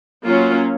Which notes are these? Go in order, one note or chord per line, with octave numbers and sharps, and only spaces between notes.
F#3 A#3 C#4 F4